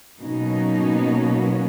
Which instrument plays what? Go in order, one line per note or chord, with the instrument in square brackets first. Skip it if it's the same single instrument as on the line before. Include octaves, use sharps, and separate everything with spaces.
[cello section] B2 F#3 A#3 C#4 D#4